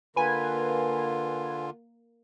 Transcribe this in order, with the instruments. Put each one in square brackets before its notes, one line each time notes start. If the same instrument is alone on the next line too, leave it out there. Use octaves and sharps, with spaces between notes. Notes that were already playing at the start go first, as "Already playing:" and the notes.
[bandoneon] D3 F4 [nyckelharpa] A#3 [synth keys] B4 G#5